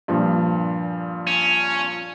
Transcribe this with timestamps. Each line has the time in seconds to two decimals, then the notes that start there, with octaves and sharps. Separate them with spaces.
0.08 G2 A#2 F3
1.27 C#4